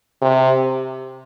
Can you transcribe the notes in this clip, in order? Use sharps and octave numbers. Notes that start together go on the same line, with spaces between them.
C3